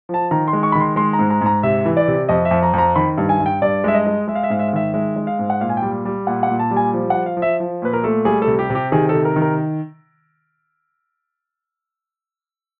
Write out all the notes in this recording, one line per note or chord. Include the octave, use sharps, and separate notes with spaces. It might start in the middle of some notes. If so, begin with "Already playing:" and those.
F3 A5
D#3 A#5
C6
G#3
C#6
B5
D#3
C6
G#3 C6
A#5
G#2
A#5
G#2 A#5
C3 E5
E3
D5
C3
F2 D#5
E5
F2
A#5
F2 A#5
D#3 B5
G2
G#5
G2
G5
G2 D5
G#3 E5
D#5
G#3
G#3 E5
F5
E5
G#2 F5
E5
F5
D#3 E5
G#3 E5
G#3
F5
G#2
F#5
A#2 F5
G#5
G5
G3
G3
A#2 F#5
F#5
A#2
A5
G3
G#5
F3
F3 F#5
F5
F3
E5
F3
A#2 B4
A#4
A3 A4
G3 G#4
A4
C3
G4
C3
G4
D#3 G#4
A4
C3
A#4
D#3
A#4